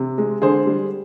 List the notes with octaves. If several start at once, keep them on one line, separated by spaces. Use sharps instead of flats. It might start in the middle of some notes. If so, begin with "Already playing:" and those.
Already playing: C3
G#3
D3 G#4 C5
G3